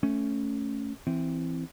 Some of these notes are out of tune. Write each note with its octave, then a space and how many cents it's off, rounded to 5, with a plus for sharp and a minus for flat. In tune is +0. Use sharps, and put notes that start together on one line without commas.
A3 +0 C#4 +0
E3 +0 C4 +0